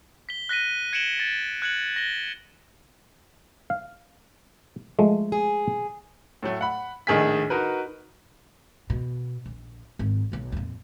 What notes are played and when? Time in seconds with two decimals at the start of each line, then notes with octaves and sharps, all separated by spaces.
0.29 B6 G7
0.49 F#6 A#6 B6 D#7
0.93 G#6 C#7 D7 E7 F#7 G7
1.20 A6
1.62 F#6 G#6 C#7 F#7
1.96 A#6 G7
3.70 F5
4.99 F3 G#3 A3
5.32 G#4
6.43 A2 F#3 A3
6.61 F#5 B5
7.07 A#1 A2 D#3 G#4 G#5 B6
7.50 D#4 F#4 A#4 B4
8.90 B2
9.46 A#1
9.99 G#1
10.32 B1 B2
10.52 F2 A#2